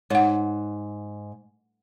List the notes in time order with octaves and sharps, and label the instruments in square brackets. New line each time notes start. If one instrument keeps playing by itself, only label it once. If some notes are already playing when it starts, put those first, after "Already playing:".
[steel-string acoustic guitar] G#2 [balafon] C#5 F#5